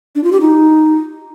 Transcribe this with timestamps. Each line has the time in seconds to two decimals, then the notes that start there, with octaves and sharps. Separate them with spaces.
0.15 D4
0.24 F4
0.32 G4
0.41 D#4